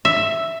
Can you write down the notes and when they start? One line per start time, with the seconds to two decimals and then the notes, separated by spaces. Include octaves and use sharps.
0.05 E5